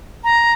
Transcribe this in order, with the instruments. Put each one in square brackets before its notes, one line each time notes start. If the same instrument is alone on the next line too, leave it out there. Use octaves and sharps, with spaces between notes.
[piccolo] A#5